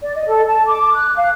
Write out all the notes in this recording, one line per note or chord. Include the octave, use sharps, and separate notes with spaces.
D5
D#5
A4
A5
D6
F#6
F5